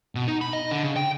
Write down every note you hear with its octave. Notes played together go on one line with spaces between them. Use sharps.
B2
D#4
B5
D#5
D3
C#3
G5